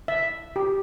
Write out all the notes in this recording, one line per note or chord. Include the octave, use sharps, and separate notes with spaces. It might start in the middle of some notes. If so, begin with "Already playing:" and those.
E5
G4